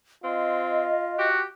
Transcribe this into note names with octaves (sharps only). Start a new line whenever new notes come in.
C4 F4 D#5
F#4 G4